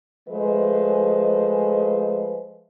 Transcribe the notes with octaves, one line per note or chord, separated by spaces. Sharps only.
F3 G#3 A3 B4 C5 D#5